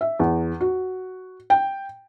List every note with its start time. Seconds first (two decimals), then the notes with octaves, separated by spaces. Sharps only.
0.01 E5
0.20 E2
0.61 F#4
1.50 G5